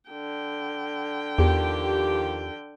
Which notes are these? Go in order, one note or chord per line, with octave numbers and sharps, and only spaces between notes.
D3 G5
E2 D#3 F3 G4